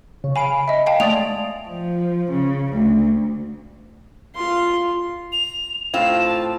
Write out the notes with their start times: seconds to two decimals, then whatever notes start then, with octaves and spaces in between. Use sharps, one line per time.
0.24 C#3
0.36 F5 G#5 B5 D7
0.68 D#5 E5
0.86 F5 G5 A5
1.00 G#3 A3 D5 D#6 F7
1.68 F3
2.31 C#3
2.73 D2
4.36 F4 C6
5.32 F7
5.94 A2 C4 F4 E7
6.24 A5